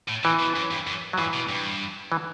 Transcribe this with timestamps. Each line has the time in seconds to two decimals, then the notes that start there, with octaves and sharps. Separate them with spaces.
0.09 A2
0.24 C3 E3
0.40 B2
0.56 F#2
0.71 G2
0.87 F#2
1.13 F#3
1.18 G2 E3
1.34 B2
1.49 G2
2.12 E3